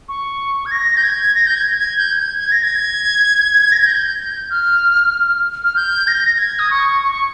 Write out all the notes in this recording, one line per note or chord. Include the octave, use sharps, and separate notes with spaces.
C#6
G#6
A#6
G6
G#6
A#6
G6
G#6
G#6
G6
G#6
G#6
A#6
G#6
A#6
G#6
G6
F6
F6
G6
A#6
G#6
D#6
C#6
C#6
C#6